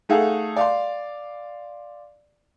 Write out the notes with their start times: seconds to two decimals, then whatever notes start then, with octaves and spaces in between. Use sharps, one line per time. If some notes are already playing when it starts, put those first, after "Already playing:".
0.09 A3 D#4 G#4 A4 F5 F#5
0.56 D5 F5 C6